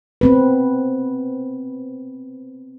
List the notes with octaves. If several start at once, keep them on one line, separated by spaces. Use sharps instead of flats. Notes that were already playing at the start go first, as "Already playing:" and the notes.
B3 C4 B4